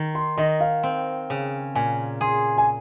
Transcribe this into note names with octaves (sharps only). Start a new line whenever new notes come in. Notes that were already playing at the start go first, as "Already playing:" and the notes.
Already playing: D#3
C6
D#3 D#5
F5
C4
C#3
A#2 G#5
G#4 C6
G#5